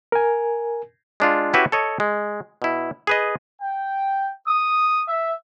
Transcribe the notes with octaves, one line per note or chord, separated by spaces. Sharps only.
A#4 G#5
G#3 D4 F4
C#4 E4 F#4 G4 B4 E5
A4 C#5 D#5
G#3
B2 E4
G#4 B4 D#5
G5
D#6
E5